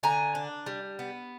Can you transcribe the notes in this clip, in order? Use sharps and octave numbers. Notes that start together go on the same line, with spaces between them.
D3 G#5 A#5
D4
G3
B3